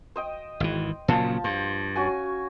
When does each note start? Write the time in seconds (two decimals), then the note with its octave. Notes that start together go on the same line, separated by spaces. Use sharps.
0.16 C5 D#5 G5
0.60 G#1 E3
1.08 A#2 C#3 F3 F#3 A5
1.44 G2 C5
1.96 C#4 F#4 G#5